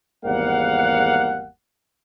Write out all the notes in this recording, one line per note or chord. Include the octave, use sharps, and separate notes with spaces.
G#1 E2 G3 A#3 F5 F#5